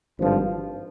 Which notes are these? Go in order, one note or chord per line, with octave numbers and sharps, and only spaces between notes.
G#1 G2 D3 F3